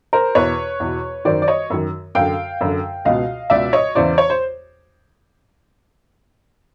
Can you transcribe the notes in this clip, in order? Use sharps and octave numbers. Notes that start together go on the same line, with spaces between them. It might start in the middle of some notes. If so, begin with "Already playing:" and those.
A#4 C5
E2 B2 B4 C#5
E2 B2
F#2 D#3 C5 D5
D5
C#5 D#5
F#2 D#3
F#2 D3 F5 G5
F#2 D3
C#2 B2 D#5 F5
C#2 B2 D5 E5
C#5 D#5
E2 C#3 E3 C5 D5
C#5
C5